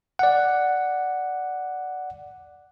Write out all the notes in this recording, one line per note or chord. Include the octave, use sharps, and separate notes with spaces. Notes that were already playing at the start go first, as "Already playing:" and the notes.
D5 F#5